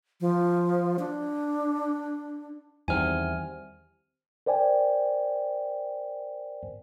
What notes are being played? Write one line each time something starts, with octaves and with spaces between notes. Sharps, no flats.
F3
D4
E2 D#3 G3 C4 G#5 F6
A#4 C5 D5 G5 G#5